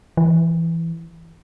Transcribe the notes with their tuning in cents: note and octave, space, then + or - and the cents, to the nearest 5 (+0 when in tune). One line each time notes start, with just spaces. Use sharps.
E3 +10